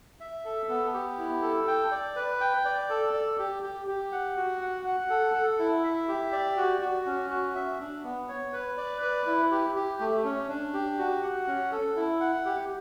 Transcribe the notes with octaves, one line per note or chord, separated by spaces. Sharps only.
E5
A4
B3
G4
E4
A4
G5
D5
B4
G5
D5
A4
D5
G4
G4
G4
F#5
F#4
F#5
F#5
A4
A4
E4
E5
G4
D5
F#4
F#4
C#4
F#4
E5
D4
B3
C#5
B4
D5
B4
E4
G4
G4
A3
C#4
D4
G4
F#4
F#5
C#4
A4
E4
F#5
G4